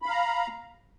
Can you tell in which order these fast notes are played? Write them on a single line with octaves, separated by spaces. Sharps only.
B5 F5 A#5